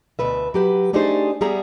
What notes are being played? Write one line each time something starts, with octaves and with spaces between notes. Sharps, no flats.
D2 B2 B4 E5
F#3 G4 B4
A3 D4 D#4 G4 G#4 C5
G3 B3 G#4 E5 A#5